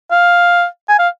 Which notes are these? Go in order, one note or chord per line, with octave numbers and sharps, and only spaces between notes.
F5
G#5
F5